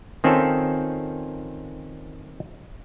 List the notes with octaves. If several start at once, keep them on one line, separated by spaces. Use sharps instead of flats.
D#3 C4 C#4 F4 A4